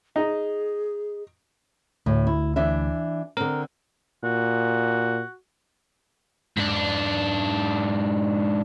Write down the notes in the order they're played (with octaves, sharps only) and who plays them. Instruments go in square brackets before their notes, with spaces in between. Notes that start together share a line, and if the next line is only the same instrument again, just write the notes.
[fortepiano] D#4 [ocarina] G#4
[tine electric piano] D2 [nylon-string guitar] A2
[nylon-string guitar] E4
E3 D4 E5
[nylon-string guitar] D3 C4 [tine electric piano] A#4
[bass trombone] A#2 [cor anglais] F#4
[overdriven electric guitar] G#2 D4